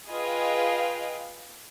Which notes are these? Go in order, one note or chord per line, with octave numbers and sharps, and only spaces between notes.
F4 G#4 B4 D#5 F5 G5